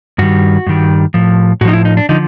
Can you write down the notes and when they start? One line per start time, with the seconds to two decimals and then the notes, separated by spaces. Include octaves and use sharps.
0.18 G2 D#3 G3 F#4
0.67 G2 D#3 G3
1.14 A2 F3
1.61 A2 F#4
1.65 F3 D#4
1.73 E4
1.85 D#4
1.97 D4
2.09 D3 F3 D#4